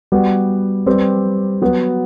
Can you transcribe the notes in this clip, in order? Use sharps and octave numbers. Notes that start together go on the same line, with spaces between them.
G3 B3 F#4 B4
G3 C4 G4 B4
F#3 B3 F#4 B4